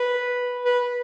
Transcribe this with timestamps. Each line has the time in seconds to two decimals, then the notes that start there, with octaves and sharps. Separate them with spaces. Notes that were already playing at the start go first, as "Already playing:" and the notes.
Already playing: B4
0.65 B4